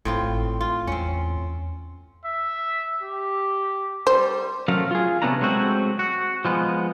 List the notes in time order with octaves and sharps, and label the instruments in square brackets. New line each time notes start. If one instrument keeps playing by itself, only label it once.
[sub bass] G1 [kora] A2 C4 F4
[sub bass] G#1
[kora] F4
[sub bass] E2 [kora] C4 C#4
[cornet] E5
G4
[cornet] G3 [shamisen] C5
[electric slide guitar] F#3 A3 C#4 A#4 F5
F4 G#4
C3 A3 B3 C#4 D4 A#5
F#3 G#3 A3 C4 F#4
F#4
F3 G#3 B3